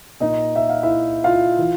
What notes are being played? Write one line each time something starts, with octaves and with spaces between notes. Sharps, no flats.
A#2 D#4 D#5
E5
F5
E4 E5
F4 F5
E3